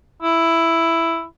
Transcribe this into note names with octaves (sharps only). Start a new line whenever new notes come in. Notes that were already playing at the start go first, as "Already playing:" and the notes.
E4